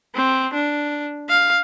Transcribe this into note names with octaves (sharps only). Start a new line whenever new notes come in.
C4
D4
F5